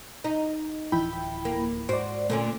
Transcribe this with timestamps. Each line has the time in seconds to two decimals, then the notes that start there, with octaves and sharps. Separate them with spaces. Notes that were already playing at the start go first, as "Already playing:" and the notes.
0.24 D#4
0.92 D1 E3 F3 E4 G5 B5
1.45 A#3
1.89 G#2 F#4 C5 D5
2.30 A#2 D3 A3 C#4